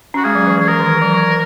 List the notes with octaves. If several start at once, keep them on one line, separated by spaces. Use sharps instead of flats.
C#4 F#4
G#3 G#4
F#3
E3
E3
G#4
E3 A#4
D#3
E3
F#3
E3